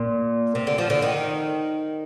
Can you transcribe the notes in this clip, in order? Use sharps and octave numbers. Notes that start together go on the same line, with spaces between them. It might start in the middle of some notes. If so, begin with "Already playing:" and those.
Already playing: A#2
C3
D3
F3
D3
D#3